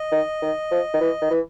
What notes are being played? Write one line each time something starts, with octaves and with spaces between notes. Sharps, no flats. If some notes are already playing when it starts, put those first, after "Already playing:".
Already playing: D#5
D#3
D#3
F3
D#3
E3
D#3
E3